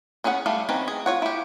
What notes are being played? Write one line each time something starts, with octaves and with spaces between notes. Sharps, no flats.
B3 C#4 G#4 E5 F#5
G3 A3 F5
D#3 C4 C#4 B4
G#4
F4 C#5 F#5
E4 G4